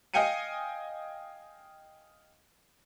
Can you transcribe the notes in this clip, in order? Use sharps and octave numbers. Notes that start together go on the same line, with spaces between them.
D#5 F5 G5 G#5 C#7 D#7